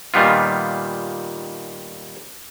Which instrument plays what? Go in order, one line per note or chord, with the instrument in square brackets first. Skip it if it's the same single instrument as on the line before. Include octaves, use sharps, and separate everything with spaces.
[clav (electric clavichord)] A#2 D#3 G3 B3 F4